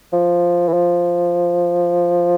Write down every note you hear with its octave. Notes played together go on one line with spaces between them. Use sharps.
F3
E3
F3